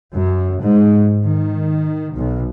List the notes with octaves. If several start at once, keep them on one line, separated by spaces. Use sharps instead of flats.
F#2
G#2
D#3
B1